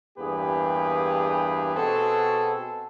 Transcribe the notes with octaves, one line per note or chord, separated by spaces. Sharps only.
E2 G2 A#3 G4 G#4 B4
B2 C4 F#4 G#4 A4